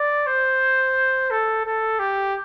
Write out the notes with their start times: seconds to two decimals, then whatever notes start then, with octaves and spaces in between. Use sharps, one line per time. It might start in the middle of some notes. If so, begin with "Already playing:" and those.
Already playing: D5
0.27 C5
1.31 A4
1.65 A4
1.99 G4